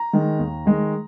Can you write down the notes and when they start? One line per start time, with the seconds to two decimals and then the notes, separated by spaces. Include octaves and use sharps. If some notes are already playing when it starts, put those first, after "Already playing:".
Already playing: A#5
0.13 D#3 G#3
0.39 D#2
0.66 D#3 G#3